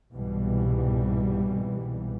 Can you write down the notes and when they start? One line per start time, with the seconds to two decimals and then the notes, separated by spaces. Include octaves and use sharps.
0.13 C2 G#2 B2 E3 G3